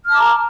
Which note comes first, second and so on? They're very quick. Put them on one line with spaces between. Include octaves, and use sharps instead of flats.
F6 A5 D6 A#5